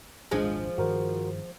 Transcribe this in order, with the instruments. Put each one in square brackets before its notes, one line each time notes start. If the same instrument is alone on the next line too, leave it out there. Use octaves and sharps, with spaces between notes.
[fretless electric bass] D#1 G#1 D4 [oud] F3 G#3
[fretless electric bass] G2 D#3 [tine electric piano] F#4 A#4 C5